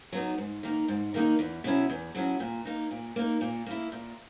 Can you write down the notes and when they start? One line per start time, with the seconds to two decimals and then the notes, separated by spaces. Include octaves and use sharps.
0.12 F#3 B3 D#4
0.38 G#2
0.63 D#3 A#3 D#4
0.88 G#2
1.14 D#3 A#3 D#4
1.39 E2
1.64 B2 F#3 C#4 E4
1.90 E2
2.15 B2 F#3 C#4 E4
2.40 A#2
2.65 A#3 D#4
2.91 A#2
3.16 A#3 D#4
3.41 A#2
3.66 A#3 E4
3.92 A#2